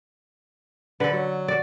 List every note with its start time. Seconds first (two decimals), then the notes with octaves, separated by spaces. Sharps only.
1.00 D3 A4 B4
1.12 F#3
1.48 F#4 D5